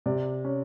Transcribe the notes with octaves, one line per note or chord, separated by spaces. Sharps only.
C3 D5
C#4